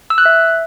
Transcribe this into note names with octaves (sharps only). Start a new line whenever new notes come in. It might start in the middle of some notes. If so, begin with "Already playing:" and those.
E6
F#6
E5